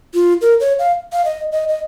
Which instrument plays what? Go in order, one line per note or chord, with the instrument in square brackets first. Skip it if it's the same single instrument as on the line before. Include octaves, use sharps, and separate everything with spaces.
[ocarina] F4
A#4
C#5
F5
F5
D#5
D#5
D#5